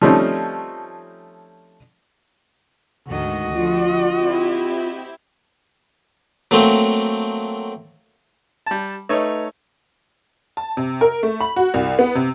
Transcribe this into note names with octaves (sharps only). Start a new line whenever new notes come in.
F3 G3 A3 C4 C#4 D#4
D2 G#2 D#3 F#4 D#5
D3 F3 F4
C4 E4 G4
F#3 A3 A#3 C4
G3 A5
A3 D#4 B4 C#5 D#5
A5
C3
A#4
A3
B5
F#4
C2
B3
C3